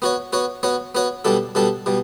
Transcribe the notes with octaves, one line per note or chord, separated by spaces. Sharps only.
B3 F#4 C#5
B3 F#4 C#5
B3 F#4 C#5
B3 F#4 C#5
B2 G3 D4 A4
B2 G3 D4 A4
B2 G3